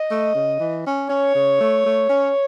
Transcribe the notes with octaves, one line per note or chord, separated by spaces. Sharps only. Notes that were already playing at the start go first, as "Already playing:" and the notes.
Already playing: D#5
A3
C#3
E3
C#4
C#4 C#5
C#3
A3
A3
C#4